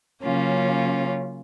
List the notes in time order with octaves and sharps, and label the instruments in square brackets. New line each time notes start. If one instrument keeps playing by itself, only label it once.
[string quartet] C#3 F#3 A#3 C#4 F4